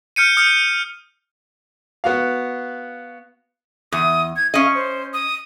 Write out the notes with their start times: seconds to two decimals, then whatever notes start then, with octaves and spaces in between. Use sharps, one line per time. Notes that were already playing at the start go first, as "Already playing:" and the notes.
0.16 F6 G6 C#7 D#7
0.37 D#6 F6 G6 C#7
2.04 B3 F#4 F5
3.92 E2 D#6
4.36 G#6
4.54 C#4 D#5 F5
4.75 C5
5.13 D#6